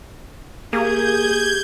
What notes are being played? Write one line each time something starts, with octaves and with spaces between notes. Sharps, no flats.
A#3 G4 G#4 G6 G#6